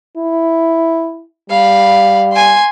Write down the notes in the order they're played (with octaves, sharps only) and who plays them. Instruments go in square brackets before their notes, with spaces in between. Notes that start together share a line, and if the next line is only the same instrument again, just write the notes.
[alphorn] E4
[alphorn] G3 [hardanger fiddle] F5 B5
[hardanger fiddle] G#5 C6